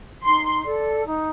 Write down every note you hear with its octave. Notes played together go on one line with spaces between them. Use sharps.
D#4 C6
A4 D5
D#4